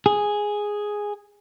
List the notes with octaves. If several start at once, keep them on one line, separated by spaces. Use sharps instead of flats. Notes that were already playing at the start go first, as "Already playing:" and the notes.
G#4